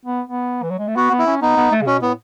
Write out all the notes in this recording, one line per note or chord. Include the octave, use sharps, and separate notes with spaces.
B3
B3
E3
F#3
G#3
A3
B3 F#4
B3
E4
C#4
B3 D#4
B3
A3
C#3
B2 C#4
A2 B3